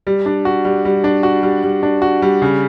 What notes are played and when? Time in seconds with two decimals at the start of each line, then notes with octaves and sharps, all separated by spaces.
0.07 G3
0.26 D4
0.45 F#4
0.65 G3
0.85 G3
1.04 D4
1.23 F#4
1.43 G3
1.64 G3
1.83 D4
2.02 F#4
2.22 G3
2.42 C#3